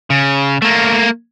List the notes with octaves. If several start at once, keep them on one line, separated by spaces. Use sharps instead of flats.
C#3
A3 A#3